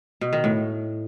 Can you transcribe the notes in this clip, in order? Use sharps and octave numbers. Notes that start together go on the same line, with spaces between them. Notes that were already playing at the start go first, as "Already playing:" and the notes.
B2
D#3
A2